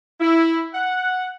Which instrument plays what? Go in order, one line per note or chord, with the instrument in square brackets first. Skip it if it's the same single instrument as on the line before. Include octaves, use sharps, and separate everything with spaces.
[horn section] E4
F#5